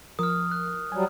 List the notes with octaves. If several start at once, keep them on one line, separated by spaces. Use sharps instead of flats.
F3 A#4 D#6 F6
F#6
F#3 G3 G#5